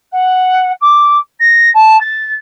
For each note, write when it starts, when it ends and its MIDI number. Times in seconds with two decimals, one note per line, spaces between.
0.12 0.72 78
0.81 1.18 86
1.40 1.70 94
1.74 1.99 81
2.01 2.34 93